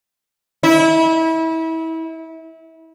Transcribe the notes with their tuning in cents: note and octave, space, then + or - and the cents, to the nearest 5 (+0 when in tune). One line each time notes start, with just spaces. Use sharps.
E4 -30